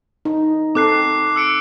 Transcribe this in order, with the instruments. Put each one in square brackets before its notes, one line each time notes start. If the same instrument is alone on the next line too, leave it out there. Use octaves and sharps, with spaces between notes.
[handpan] D#4
[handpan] C4 A4 [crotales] D6 F#6 C7
[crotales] E6 C#7 D7